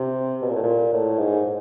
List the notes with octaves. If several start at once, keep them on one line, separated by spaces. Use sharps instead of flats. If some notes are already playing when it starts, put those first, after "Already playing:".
Already playing: C3
B2
A#2
A2
A#2
A2
G#2